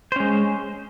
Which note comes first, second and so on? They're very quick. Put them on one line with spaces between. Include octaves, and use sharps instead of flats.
C5 C#4 G#3